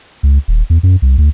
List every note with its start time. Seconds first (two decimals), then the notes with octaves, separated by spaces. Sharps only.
0.23 C#2
0.48 D#1
0.70 E2
0.83 F#2
1.02 C2
1.18 D2